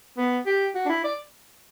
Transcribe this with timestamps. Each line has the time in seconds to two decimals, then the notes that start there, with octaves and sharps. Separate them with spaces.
0.17 B3
0.46 G4
0.75 F#4
0.86 D4
0.89 E4
1.04 D5